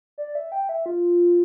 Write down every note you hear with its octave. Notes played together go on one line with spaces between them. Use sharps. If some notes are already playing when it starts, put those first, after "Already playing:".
D5
E5
G5
E5
F4